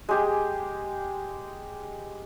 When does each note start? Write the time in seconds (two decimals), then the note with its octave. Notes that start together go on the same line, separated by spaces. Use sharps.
0.09 G#3 G4 G#4